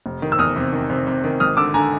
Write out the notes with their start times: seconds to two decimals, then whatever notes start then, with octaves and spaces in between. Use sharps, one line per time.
0.06 F1
0.22 D#3
0.32 E6
0.38 E2 D#6 F6
0.56 C3
0.73 D#3
0.90 C3
1.07 C3
1.24 D#3
1.40 G#1 D#6 F6
1.57 D3 D6 E6
1.74 D3 G#5 A#5